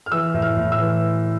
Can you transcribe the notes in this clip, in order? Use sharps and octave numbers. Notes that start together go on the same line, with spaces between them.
F6
E3 E6
A2
F6
A2
E6
E3